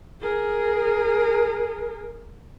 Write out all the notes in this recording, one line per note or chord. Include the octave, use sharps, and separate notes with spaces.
G#4 A#4